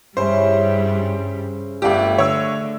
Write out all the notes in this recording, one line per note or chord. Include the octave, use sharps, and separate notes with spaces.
G2 C#3 G3 C#4 E4 C5
G1 A3 D4 F4 G4
D3 C#5 E6